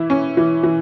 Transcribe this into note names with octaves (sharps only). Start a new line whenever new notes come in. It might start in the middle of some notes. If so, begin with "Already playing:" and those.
Already playing: E3 E4
C#4
E3
E3